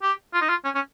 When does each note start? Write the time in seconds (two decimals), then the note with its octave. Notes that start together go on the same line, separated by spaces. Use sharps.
0.02 G4
0.33 F4
0.41 D#4
0.49 F4
0.64 C#4
0.75 C#4